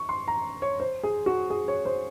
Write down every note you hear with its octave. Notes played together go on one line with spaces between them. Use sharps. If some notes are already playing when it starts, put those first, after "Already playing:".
Already playing: C#6
C6
A#5
C#5
C5
G#4
F#4
G#4
C#5
C5